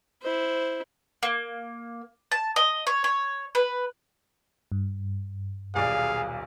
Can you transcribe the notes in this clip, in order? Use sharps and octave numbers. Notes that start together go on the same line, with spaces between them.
E4 C5
A#3
A5
D#5
C#5
C#5
B4
G2
D#1 B1 G#4 D5 F5